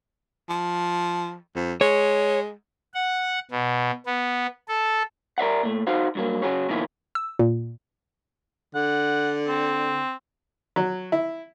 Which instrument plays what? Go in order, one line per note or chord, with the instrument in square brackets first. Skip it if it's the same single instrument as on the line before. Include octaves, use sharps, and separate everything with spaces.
[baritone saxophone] F3
F2
[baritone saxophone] G#3 [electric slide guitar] C#5
[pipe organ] F#5
B2
B3
A4
[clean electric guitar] A#4 D5 E5 F#5
A#2 A3
D#4 F#4 C5 F5
G2 F#3 A#3
C#3 F#3 F#4 G#4 C#5
B2 D#3 F3 A#3 E4
[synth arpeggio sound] E6
A#2
[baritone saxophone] D3 [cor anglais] F#5
[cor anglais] C4
[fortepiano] F#3
E4